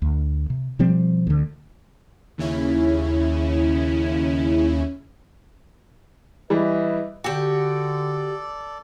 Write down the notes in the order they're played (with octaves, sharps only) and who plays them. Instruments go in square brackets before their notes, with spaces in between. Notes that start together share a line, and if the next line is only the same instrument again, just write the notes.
[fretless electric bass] D2
C3
B2 F3 G3 C4
D2 D3
[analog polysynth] D#2 C#3 C#4 E4
[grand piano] E3 G3 [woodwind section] B4 D#5 E5
[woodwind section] D3 [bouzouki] F#4 G4 [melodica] A4 D5 [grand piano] G5